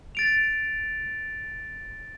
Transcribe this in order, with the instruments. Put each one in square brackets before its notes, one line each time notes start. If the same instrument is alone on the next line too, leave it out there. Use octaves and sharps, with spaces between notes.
[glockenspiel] A6 D7 F7